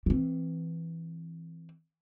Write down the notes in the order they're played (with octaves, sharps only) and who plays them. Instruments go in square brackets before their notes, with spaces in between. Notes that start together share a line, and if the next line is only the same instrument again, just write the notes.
[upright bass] E3 C4